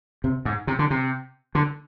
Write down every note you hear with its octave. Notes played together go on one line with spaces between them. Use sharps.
C3
G#2
C3
D3
C3
D3